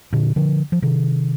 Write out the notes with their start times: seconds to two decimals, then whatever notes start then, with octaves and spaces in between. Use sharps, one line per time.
0.13 A#2 D3
0.36 D3 F3
0.72 F3
0.82 C3 D#3